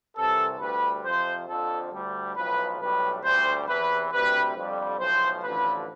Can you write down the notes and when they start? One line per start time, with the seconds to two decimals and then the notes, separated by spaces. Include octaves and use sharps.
0.16 C2 C3 E3 A4
0.60 D2 D3 G3 B4
1.05 F2 C3 F3 C5
1.48 F2 D3 F3 A4
1.92 D2 D3 G3
2.35 B1 A2 F3 B4
2.80 B1 A2 G3 B4
3.24 D2 D3 G3 C5
3.68 E2 C3 E3 B4
4.12 D2 C3 G3 B4
4.56 F2 D3 G3
4.99 B1 A2 F3 C5
5.43 A1 G2 D3 F3 B4